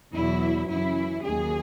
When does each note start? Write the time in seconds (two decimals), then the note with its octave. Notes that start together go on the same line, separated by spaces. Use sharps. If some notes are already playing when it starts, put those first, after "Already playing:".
0.13 E2 B2 F#3 E4
0.69 F#2 C#3 E3 E4
1.23 D#2 D#3 F#3 G#4